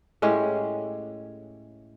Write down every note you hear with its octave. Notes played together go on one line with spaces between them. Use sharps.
A2 G#3 C#4 G4